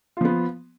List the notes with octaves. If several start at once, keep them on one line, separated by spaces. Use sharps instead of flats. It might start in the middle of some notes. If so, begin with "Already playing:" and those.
F3 B3 F4